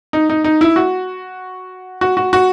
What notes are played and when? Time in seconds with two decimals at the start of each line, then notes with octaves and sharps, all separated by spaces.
0.13 D#4
0.30 D#4
0.44 D#4
0.61 E4
0.76 F#4
2.01 F#4
2.17 F#4
2.33 F#4